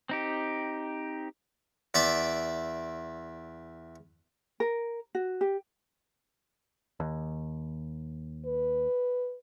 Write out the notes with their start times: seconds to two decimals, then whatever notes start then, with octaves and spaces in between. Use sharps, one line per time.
0.09 C4 D#4 G4
1.94 E2 D5 E5 D6
4.60 A#4
5.15 F#4
5.41 G4
7.00 D#2
8.45 B4